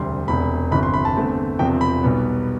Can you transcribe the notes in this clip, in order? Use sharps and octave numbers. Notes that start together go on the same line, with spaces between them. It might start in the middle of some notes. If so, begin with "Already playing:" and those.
Already playing: E1 D2 C3 G3 C4 C6
E1 E2 C3 B5
G1 F2 C3 E3 B5
C6
B5
A5
E2 D3 A3 C4
E1 E2 C3 F3 C4 G5
B5
B1 B2 G3 B3